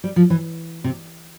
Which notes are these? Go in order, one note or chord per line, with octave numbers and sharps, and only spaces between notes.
G3
F3
E3
C3